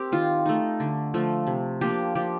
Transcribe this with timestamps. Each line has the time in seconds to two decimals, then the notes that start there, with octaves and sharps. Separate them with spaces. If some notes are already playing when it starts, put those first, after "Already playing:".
Already playing: C4 G4 A#4
0.12 D#3 F4
0.46 A3 D#4
0.80 D3
1.14 F3 A3
1.47 C3
1.81 F3 A#3 D4 G4
2.15 F3 G4